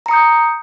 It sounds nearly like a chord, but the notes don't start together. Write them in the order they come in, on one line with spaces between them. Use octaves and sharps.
A#5 C#7 D#6 G6